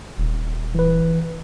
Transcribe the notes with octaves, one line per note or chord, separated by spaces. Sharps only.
D#1
E3 B4